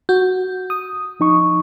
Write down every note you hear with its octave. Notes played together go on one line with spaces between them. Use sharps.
F#4 G6
D#6
F3 D#4 C#6